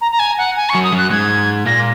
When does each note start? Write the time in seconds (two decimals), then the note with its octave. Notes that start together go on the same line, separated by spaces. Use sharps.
0.01 A#5
0.11 A#5
0.19 G#5
0.38 F#5
0.56 G#5
0.69 C#6
0.75 F#2 F#3
0.83 D#6
0.93 F#2 F#3 F#6
1.11 G#2 G#3 G#6
1.66 A#2 A#3 A#6